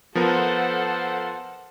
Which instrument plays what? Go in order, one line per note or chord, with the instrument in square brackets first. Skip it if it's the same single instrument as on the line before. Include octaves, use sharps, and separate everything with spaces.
[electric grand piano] F3 B3 A#4 [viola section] A4 C5 F#5